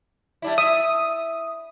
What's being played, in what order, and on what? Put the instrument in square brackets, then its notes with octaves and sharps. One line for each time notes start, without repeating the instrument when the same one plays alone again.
[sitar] G3 D4 E4
[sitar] E5 [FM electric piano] D#6